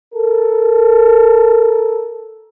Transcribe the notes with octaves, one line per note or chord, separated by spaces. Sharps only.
A4 A#4